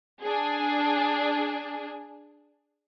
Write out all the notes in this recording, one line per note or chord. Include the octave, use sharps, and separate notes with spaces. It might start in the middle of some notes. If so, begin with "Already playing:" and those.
D4 G#4